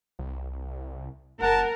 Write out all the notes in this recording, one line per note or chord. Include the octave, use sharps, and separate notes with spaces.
C2
F#1 A#4 F#5 A5